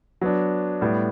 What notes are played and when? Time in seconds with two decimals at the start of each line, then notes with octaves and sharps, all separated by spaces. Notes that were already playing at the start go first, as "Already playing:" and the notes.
0.21 F#3 B3 D4
0.81 A2 G3 B3